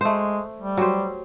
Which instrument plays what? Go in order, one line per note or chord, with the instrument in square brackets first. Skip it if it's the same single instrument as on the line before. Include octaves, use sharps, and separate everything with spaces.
[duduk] G#3 [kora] A3 C5
[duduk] G3
[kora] F#3 G4 C5